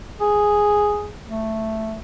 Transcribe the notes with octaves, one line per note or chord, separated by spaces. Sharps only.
G#4
A3